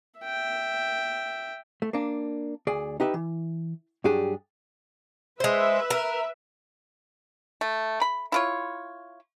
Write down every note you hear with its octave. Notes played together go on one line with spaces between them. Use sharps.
E5 G5
A3
A#3 D4
D2 G#4 D5
D#4 G4 B4 E5
E3
G2 F#3 D4 G4 G#4
G#3 B4 C5 E5
A#4
A3
B5
E4 F4 C#5